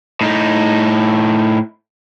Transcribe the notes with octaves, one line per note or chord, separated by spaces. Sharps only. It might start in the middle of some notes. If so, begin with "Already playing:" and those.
A2 D#4